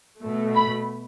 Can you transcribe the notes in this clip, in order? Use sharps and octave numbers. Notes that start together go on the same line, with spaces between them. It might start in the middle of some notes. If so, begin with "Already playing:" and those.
B2 A3
B5